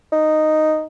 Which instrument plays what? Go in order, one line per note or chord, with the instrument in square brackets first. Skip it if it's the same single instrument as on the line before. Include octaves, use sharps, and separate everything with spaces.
[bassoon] D#4